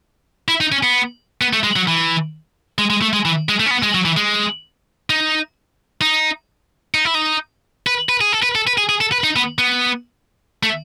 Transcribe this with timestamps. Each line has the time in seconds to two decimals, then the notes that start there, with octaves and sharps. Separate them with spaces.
0.48 E4
0.61 D#4
0.72 C#4
0.83 B3
1.41 B3
1.53 A3
1.64 G#3
1.76 F#3
1.87 E3
2.78 G#3
2.90 G#3
3.02 A3
3.13 G#3
3.25 E3
3.49 G#3
3.60 A3
3.66 C#4
3.71 B3
3.83 G#3
3.95 F#3
4.05 E3
4.17 G#3
5.10 D#4
6.01 D#4
6.94 D#4
7.05 E4
7.15 D#4
7.87 B4
8.09 B4
8.21 G#4
8.33 A4
8.43 B4
8.55 A4
8.67 B4
8.78 G#4
8.89 G#4
9.01 A4
9.12 B4
9.24 D#4
9.36 B3
9.58 B3
10.63 A3